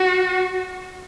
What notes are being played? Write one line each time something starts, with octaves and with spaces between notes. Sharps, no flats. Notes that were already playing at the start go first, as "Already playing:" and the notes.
Already playing: F#4